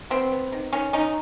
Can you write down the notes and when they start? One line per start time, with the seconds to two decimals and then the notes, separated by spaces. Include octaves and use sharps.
0.10 B3 C4
0.32 B3
0.52 D#3
0.73 D#3 C#4
0.93 D#3 C#4 D#4